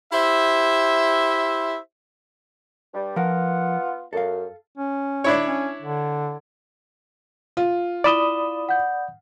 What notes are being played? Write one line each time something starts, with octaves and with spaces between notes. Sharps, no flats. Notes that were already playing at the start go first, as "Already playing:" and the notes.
E4 G4 C5 E5
G2 G3
F3 B3 F4 A#4 F#5
F#2 A4 F5
C#4
D4 E4 C#5
C#4
D3
F4
E4 D5 B5 D#6 E7 G7
F#5 G6